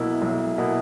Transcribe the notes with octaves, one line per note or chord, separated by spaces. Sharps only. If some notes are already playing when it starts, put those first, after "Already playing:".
Already playing: B1 B2 A#3 E4
B1
B2 A#3 E4